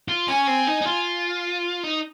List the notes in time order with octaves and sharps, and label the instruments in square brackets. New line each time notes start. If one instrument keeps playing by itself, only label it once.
[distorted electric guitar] F4
[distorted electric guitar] C#4 [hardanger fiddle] G#5
[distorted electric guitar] C4
D#4
D#4
F4
D#4